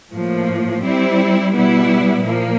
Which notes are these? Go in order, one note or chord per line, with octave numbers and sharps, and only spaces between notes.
A2 F3 A#3
G3 C4 E4
B2 G3 B3 E4
A#2 F3 A#3